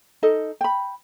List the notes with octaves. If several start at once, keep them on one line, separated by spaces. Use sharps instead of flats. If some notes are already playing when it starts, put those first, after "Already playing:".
D#4 A4 D#5
G5 B5